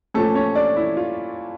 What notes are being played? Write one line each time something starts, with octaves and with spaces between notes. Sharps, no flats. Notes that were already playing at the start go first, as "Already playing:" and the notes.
A#2 F3 A3 C#4 A4
C#4 C#5
D4 D5
E4
F4